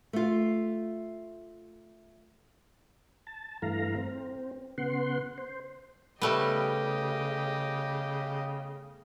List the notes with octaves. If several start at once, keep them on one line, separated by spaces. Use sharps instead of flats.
A3 F4
A5
G2 E3 A3 F5 A#5
C4
C#3 B3 F#5 C6
C5
C#3 G3 A3 B3 G4 D#5